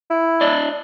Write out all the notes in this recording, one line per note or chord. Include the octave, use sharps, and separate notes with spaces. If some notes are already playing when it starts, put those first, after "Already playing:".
E4
D4 D5 D#5